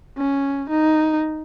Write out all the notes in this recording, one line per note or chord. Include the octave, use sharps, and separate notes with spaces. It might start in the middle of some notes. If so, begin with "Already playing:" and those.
C#4
D#4